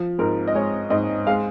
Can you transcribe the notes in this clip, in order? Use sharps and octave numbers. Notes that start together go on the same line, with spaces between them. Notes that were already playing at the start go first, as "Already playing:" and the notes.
Already playing: F3
G#2 A#4
D#5
G#3 C#5
G#2 D#5
G#3 F5